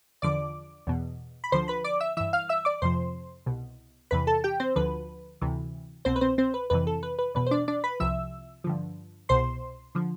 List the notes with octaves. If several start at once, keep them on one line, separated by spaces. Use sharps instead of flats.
E2 D3 F3 D5 D6
E2 B2
B5
D2 D3 F3 C5 C6
B4 B5
D5 D6
E5 E6
G2 E3 E5 E6
F5 F6
E5 E6
D5 D6
F2 C3 F3 C5 C6
C2 B2
E2 C3 E3 B4 B5
A4 A5
G4 G5
C4 C5
D2 D3 F3 B4
D2 C3 E3
C2 B2 C4 C5
B4
C4 C5
C4 C5
B4
F2 C3 E3 B4
A4
B4
B4
E2 B2 B4
C5
D4 D5
D4 D5
B4 B5
C2 C3 F3 E5 E6
G2 D3 F3
C2 B2 C5 C6
D3 F3